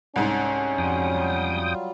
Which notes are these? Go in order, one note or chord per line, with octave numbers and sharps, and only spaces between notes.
C2 G#2 C#4
F2 F#3 G3 F4 G5 D#6